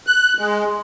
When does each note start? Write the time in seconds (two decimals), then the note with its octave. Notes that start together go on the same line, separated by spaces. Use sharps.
0.07 F#6
0.38 G#3